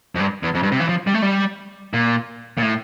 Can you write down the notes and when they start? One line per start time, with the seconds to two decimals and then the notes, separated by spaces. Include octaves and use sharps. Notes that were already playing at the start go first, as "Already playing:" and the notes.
0.15 F2
0.20 G2
0.43 E2
0.54 F2
0.63 G2
0.72 C3
0.80 E3
0.89 F3
1.07 G3
1.14 A3
1.22 G3
1.94 A#2
2.58 A#2
2.62 A2